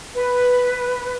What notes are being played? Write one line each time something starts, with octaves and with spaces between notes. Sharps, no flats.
B4